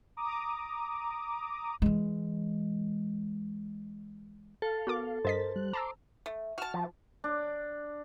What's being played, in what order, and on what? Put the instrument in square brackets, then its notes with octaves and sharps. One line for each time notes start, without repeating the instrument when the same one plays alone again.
[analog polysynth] A#5 D6 D#6
[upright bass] E3 G#3
[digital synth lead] A4 [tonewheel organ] F5
[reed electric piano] B3 [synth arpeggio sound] F#4 A#4 D6
[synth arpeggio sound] G2 D#5 B6 [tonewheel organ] A#4 A6 [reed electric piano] C5
[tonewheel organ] G3 F#6
[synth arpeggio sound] A5 A#5 E6 [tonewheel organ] C6 D6
[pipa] A3
[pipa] F#4 A5 [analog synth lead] F6
[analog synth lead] F3
[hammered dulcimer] D4